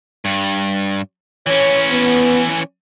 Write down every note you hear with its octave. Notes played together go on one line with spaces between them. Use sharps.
G2
E3 C#4 C#5
B3